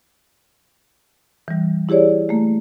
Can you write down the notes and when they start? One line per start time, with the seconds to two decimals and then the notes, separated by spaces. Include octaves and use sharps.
1.48 E3 G3
1.89 E4 G4 G#4 C#5 D5
2.29 A3 A#3